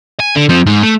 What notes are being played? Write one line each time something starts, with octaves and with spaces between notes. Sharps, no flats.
G#5
D3
F3 C4
G#2
A3